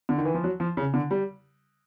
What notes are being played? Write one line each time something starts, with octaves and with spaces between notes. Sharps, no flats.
D3
D#3
E3
F3
F#3
F3
C#3
D3
G3